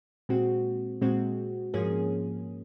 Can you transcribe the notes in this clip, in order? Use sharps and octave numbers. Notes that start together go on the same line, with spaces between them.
A#2 G#3 C4 F#4
A#2 G#3 C4 F#4
G#2 F3 A#3 C#4 G#4